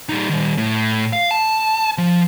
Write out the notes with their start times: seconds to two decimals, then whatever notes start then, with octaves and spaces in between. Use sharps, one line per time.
0.09 G3 D#4
0.30 D#3 G3
0.57 A2
1.13 F5
1.31 A5
1.98 F3